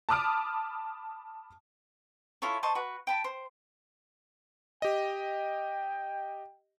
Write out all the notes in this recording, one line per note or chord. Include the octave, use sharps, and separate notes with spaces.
A5 B5 D6 D#6 F6 D7
E4 F4 A4 C#5
C5 D#5 A5 C#6
F#4 B4
G5 A5 B5
C5
G4 D#5 G5